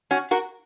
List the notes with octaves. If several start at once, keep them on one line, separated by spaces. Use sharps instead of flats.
C#4 F#4
F#4 A#4